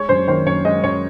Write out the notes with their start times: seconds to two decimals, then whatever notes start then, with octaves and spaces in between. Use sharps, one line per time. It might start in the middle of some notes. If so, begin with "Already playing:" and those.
Already playing: G#3 C#5
0.09 F#2 C5
0.28 D#3 C5
0.46 F#2 C#5
0.65 G#3 D#5
0.83 F#2 C#5